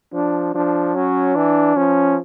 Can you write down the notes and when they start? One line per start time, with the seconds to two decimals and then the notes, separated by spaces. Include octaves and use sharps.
0.13 F3 D4
0.54 F3 D4
0.95 F#3 C#4
1.35 E3 D4
1.76 F3 C#4